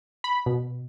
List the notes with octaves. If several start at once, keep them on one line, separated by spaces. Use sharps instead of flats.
B5
B2